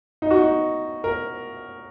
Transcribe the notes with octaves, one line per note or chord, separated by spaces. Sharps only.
D#4
F#4
D#4
A#4